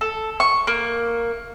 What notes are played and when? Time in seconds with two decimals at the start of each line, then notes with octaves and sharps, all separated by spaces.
0.01 A4
0.40 C#6
0.67 A#3